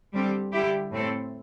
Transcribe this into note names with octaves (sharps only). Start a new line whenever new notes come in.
D3 G3 C4 G4
D3 G3 E4 G4
A2 A3 C4 A4